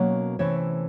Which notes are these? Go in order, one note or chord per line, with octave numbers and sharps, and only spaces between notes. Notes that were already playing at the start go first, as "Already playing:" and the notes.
Already playing: B2 F#3 A#3 C#4
C3 E3 A3 C#4 C#5